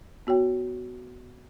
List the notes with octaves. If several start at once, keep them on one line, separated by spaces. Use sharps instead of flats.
B3 F#4 C#5 G5